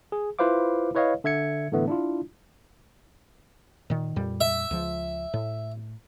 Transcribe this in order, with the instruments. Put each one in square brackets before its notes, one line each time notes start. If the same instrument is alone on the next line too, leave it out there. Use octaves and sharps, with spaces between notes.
[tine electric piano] G#4
E4 F4 B4 C5 F5 D6
E4 B4 C#5 D#5 F5
D3 E5 G#6 C#7
A2 D3 E3 A3 B3
D4 E4 F4
[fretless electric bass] A#2 D#3
F2 A#2 G3
[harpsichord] E5
[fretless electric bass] C#2 F3
A2